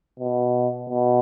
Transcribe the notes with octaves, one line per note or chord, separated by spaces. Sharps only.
B2
B2